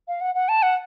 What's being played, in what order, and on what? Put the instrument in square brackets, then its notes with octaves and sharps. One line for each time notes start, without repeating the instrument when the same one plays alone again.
[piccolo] F5
F#5
F#5
A5
F#5